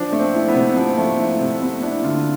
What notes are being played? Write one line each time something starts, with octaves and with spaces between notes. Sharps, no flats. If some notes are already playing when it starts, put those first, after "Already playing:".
Already playing: F3 D4
A3
C4
E4
B3
C3
F3
A3
E4
C3
A3 B3
D4 E4
D3 F4